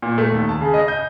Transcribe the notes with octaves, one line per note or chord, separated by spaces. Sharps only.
A#2
A3
D#2
A5
C#3
D#5
G6